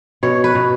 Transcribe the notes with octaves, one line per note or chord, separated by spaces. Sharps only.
B2 C#5
B4
B2